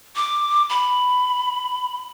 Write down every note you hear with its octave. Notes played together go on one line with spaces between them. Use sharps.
D6
B5